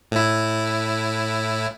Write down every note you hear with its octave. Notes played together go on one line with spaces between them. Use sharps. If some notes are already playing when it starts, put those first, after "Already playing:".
A2 E4